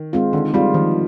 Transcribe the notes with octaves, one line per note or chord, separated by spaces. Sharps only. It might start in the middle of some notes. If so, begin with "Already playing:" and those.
Already playing: D#3
G#3 C4 F4
D3 D#3
G3 G#3 C4 F4
D#3 F3